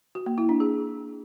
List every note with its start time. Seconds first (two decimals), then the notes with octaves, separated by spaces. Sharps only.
0.15 F#4
0.26 A#3
0.38 E4
0.49 D4
0.60 G#4